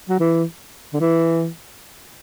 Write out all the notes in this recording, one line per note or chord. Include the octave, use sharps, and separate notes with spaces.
F#3
E3
D3
E3